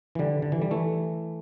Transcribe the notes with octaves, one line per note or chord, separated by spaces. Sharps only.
E3
D3 G3
D3
E3
G3
E3 A3